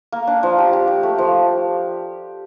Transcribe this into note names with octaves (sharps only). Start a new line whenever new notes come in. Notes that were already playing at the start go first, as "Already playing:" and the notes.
A#3
D4
F3
G4
G4
G4
A3
F3